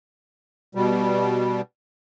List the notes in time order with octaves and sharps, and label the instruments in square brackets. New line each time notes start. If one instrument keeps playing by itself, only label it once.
[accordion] B2 G3